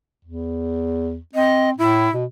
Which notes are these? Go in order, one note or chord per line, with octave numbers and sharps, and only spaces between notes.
E2
C4 D#5
A2 E4
B2